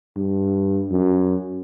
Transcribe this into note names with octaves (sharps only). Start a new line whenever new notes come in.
G2
F#2